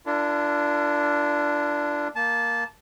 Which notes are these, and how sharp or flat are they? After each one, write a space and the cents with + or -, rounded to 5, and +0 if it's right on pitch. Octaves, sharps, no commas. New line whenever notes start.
D4 +0 F4 -45 A#4 -40
A#3 +0 A5 -15